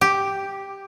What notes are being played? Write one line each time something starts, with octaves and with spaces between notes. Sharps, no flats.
G4